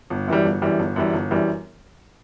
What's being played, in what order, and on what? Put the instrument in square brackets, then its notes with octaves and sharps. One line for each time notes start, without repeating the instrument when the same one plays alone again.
[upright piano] G1
F#2 E3 G3
G1
F#2 E3 G3
G1
F#2 E3 G3
G1
F#2 E3 G3